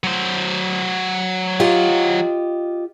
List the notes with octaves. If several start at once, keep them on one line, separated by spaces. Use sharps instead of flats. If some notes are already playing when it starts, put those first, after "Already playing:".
F#3 C5
F4 G4 D#5